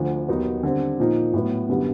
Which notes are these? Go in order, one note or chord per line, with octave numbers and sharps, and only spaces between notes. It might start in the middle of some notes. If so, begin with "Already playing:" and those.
Already playing: D2 D3 F3
D#2 D#3 F#3 B3 D#4
D3 G3 C4
A#2 F3 A#3 D#4
A2 F#3 B3
F#2 D3 G3 B3